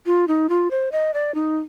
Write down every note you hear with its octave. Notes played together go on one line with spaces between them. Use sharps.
F4
D#4
F4
C5
D#5
D5
D#4